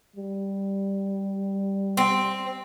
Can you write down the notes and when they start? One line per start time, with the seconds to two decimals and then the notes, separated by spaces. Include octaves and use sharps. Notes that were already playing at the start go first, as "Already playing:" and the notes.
0.16 G3
1.97 C4